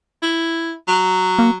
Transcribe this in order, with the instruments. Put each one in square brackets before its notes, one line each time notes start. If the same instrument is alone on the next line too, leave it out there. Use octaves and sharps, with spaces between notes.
[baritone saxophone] E4
F#3
[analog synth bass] A#3